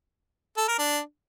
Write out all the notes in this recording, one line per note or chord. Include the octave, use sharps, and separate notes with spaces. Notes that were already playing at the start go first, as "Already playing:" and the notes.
A4
A#4
D4